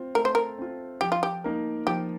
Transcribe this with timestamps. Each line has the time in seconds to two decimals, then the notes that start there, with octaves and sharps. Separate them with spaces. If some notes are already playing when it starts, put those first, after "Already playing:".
Already playing: C4 F4
0.15 A3 A#4
0.25 C5
0.35 A#4
0.58 C4 F4
1.01 F3 G4
1.12 F4
1.23 G4
1.44 A#3 D#4 A#4
1.87 F3 G4